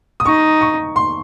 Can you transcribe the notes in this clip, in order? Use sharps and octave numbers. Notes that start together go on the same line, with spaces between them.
D#6
D#4 C#6
C#6
C6